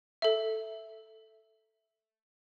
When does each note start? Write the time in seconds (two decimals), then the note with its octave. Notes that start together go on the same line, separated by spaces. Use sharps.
0.22 A4 E5